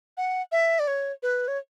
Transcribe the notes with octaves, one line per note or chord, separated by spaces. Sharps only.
F#5
E5
D5
C#5
B4
C#5